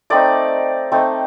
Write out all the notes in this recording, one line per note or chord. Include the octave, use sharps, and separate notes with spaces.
A3 C4 D#4 D5
A3 C4 D#4